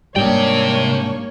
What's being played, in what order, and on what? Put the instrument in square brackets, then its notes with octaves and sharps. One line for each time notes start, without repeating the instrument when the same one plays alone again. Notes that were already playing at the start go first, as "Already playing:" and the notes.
[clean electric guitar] G#2 D4 [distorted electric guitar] C3 G5 [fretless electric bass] G3 [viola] A#3 C#5